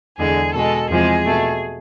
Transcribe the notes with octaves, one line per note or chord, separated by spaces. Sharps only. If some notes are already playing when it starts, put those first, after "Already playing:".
E2 D3 G#3 G#4
B2 G#3 A4
E2 C3 F3 G#3 G#4
B2 A3